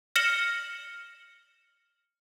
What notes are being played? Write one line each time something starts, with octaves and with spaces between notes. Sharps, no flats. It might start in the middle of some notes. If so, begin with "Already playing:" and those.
F6 A#6 C#7 E7 F#7 G7